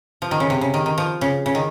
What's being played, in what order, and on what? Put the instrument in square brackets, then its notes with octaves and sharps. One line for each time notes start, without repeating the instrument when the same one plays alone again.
[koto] F3
D#3
C#3
C3
C#3
D#3
D#3
F3
C#3
C#3
D#3